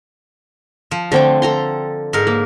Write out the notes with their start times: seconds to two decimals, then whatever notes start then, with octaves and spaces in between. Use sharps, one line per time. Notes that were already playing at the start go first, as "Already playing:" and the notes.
0.91 F3
1.12 D3 A3 C4 G5
1.42 A4 A#5 C6
2.13 G#2 A#4
2.27 A#3